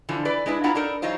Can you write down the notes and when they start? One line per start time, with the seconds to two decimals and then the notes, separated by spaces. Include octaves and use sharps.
0.09 D3 E3 F3
0.25 E3 B4 D5
0.46 G#3 D4 E4 B4
0.64 B3 D4 E4 F4 F#5 A#5
0.75 D4 D#4 A4 A#4
1.02 E3 F#3 D#4 F4 C5